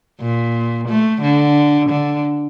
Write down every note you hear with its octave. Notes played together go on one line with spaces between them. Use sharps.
A#2
A3
D3
D3